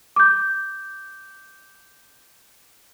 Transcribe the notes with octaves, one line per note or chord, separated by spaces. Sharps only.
D6 G6